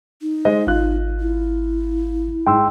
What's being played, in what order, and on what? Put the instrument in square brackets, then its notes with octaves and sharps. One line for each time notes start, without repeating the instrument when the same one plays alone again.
[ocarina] D#4
[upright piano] G#3 C5 D#5
[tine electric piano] G#1 [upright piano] F4 F#6
[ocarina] E4
[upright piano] G#2 [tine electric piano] G5 C6 E6